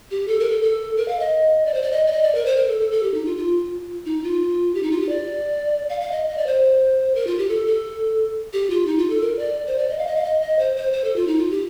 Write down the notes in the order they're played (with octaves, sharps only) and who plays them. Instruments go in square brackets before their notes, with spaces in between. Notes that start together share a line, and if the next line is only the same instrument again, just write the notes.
[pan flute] G4
A4
A#4
A4
A4
A#4
F5
D#5
D5
C5
D5
D#5
D5
D#5
D5
A#4
C5
A#4
A4
A4
A4
G4
D#4
F4
F4
D#4
F4
G4
D#4
F4
G4
D5
F5
F5
D#5
D#5
D5
C5
A#4
F4
G4
A4
A4
G4
F4
D#4
F4
A4
A#4
D5
C5
D5
D#5
F5
D#5
F5
D#5
D#5
C5
C5
C5
A4
F4
D#4
F4
G4